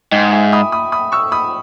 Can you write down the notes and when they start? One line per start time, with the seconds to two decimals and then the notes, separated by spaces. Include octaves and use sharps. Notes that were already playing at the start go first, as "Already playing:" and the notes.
0.12 G#2 D#5 G5
0.32 E5 G#5
0.53 B5 D#6
0.72 B5 D#6
0.92 B5 D#6
1.12 C#6 E6
1.32 B5 D#6